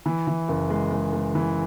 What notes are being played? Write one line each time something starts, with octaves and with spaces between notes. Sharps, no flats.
E3
E3
F#1
G#3
G#3
G#3
E3